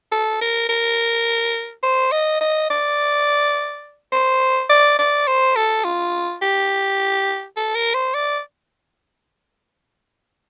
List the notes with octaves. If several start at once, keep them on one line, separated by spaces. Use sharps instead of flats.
A4
A#4
A#4
C5
D#5
D#5
D5
C5
D5
D5
C5
A4
F4
G4
A4
A#4
C5
D5